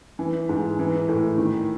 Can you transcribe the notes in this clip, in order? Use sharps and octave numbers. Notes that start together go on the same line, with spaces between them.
E3
G#2
E3
A2
D#3